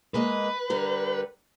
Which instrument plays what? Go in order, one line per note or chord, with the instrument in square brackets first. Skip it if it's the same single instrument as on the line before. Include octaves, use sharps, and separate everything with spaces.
[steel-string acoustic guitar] G#3 A#3 D#5 [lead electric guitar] B4
[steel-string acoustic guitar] D3 G3 A#4